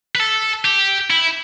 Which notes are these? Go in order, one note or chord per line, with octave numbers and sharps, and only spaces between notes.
B4
A4
G4
E4